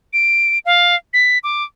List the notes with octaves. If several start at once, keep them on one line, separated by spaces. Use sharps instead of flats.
D7
F5
B6
D6